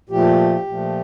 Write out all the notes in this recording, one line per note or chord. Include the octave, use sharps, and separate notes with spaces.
A#2 F3 A3 G4
A#2 F3 A3